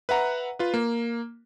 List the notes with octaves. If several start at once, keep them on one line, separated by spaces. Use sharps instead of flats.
B4 E5 F#5 A#5
F4 B4
A#3